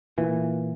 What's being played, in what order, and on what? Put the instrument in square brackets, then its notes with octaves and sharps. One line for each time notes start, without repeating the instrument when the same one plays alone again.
[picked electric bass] A#2 E3